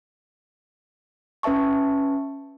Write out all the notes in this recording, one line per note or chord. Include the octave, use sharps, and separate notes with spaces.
C#4 B4 E5 A5 C#6